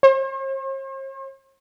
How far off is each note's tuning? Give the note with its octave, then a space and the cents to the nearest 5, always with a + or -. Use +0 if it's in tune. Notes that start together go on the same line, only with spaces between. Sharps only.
C5 +45